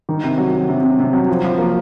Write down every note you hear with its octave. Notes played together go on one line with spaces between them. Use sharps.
D#3
C3
F#3
F#3
C3
C3
C3
F#3
F3
F3
A#3